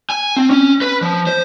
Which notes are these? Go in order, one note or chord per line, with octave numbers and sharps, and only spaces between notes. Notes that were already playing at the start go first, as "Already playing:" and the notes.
G#5
C4
C#4
B4
F3
C5